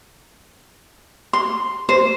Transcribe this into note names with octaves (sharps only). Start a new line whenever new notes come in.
C6
C5